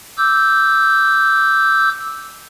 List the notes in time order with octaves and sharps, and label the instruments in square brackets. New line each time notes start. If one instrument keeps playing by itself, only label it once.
[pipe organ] D6 E6 G6